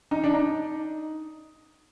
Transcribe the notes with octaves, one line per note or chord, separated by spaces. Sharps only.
D#4
D4
D#4